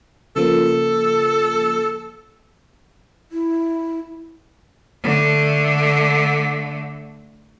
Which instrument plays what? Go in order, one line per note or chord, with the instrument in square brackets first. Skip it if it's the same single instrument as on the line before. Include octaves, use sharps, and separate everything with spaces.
[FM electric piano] C#3 F3 A#3 [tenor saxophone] A4
[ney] E4
[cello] D3 A3